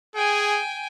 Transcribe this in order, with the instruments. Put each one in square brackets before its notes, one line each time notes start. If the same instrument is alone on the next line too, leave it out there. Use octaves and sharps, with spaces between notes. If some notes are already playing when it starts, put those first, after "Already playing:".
[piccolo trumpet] G#4 [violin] G5 G#5